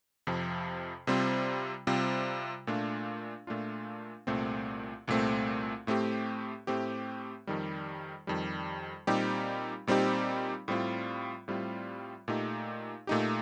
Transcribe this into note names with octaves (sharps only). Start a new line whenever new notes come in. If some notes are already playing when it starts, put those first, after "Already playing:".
F2 C3 F3
C3 G3 C4 F4
C3 G3 C4 F4
A#2 A3 D4 F4
A#2 A3 D4 F4
C2 A#2 A3 C4
C2 A#2 A3 C4
A2 A3 C4 G4
A2 A3 C4 G4
F2 D#3 G3
F2 D#3 G3
A#2 G3 C4 D#4 G4
A#2 G3 C4 D#4 G4
A2 G3 C4 F4
A2 G3 C4 F4
A#2 A3 D#4 G4
A#2 A3 D#4 G4